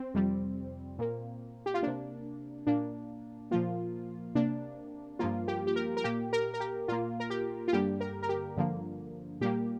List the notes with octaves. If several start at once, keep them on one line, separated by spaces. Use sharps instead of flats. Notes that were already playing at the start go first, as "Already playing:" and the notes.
Already playing: C4
F2 C3 G3
A#2 A#3
G4
F4
C3 A#3 D4
A#2 A#3 D4
A#2 F3 A#3 F4
C3 A#3 D4
G2 F3 A#3 F4
G4
G4
A#4
A#4
A#2 A#3 G4
A#4
A#4
G4
A#2 A#3 F4
A#4
G4
F4
G2 D3 G3 A#3 G4
A#4
A#4
G4
G2 D3 F3 A#3
A#2 G3 A#3 G4